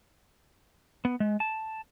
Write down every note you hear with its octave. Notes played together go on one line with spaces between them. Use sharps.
B3
G#3
A5